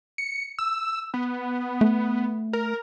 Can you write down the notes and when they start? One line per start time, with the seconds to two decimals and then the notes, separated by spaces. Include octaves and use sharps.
0.18 C#7
0.59 E6
1.14 B3
1.81 A3
2.53 A#4